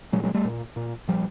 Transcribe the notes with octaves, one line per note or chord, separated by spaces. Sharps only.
A#2 F#3 G#3
F#3 G#3
G3 A3
A#2
A#2
A#2 F3 G3